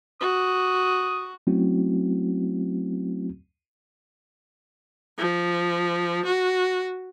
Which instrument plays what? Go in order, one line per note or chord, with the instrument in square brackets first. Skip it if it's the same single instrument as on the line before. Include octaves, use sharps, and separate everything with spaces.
[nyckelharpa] F#4 [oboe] D#6
[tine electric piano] F#3 A3 C4 C#4 E4 F#4
[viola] F3
F#4